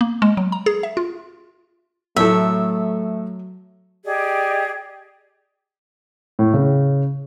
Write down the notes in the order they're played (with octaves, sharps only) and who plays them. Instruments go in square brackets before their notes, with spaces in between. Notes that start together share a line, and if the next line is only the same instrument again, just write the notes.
[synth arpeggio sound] A#3
G#3
F#3
A#5
G#4
E5
F4
[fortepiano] A2 A4 [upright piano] F#3 [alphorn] A3 [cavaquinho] E5
[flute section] G4 G#4 D5 D#5
[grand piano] A2
C#3